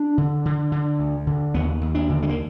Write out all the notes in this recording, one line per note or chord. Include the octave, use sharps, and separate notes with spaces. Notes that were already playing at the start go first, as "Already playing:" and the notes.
Already playing: D4
D3
D3
D3
D2
D3
D#2 B3
D#2
D4
D3
G#3
A#3